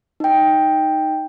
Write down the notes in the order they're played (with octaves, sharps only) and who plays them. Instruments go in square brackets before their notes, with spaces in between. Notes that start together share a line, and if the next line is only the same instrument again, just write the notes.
[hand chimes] D#4 G5